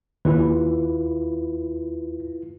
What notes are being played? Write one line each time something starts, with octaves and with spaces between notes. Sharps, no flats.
D#2 E4 F4 B4